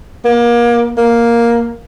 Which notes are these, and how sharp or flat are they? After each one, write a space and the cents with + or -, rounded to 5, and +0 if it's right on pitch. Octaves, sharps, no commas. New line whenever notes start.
A#3 +30
A#3 +5